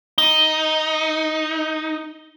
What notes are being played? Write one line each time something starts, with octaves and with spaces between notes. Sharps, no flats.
D#4 G7